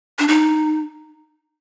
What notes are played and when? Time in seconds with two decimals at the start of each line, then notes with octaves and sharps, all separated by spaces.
0.19 D4
0.28 D#4